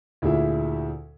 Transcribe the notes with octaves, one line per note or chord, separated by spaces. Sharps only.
D2 A#2 E4 G#4 E5